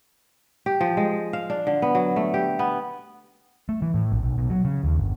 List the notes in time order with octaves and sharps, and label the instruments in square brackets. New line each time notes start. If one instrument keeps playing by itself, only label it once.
[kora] G4
F3
G#3
F5
D4
D3
B3
F#3
A3
G4
B3
[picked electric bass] A3
E3
A2
A#1
B1
B1
F#3
C#3
D#2
G1